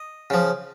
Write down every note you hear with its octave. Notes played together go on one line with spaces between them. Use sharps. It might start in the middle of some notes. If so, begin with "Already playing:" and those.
Already playing: D#5
C#3 F3